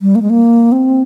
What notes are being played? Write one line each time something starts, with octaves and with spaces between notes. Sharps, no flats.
G3
A#3
G#3
A#3
C4